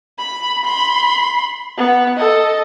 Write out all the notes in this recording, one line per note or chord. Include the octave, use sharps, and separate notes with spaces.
B5
B5 C6
B3
A4 D#5